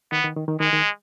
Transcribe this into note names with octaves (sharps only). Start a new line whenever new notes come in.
D#3 B3
D#3
D#3
D#3
D#3 G#3
D#3